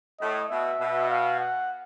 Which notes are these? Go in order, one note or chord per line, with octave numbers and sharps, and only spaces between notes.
A2 D#5
B2 E5
B2
F5
F#5